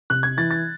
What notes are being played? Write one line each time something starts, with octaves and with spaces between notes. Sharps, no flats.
C3 F#6
G#6
E3 A6
A6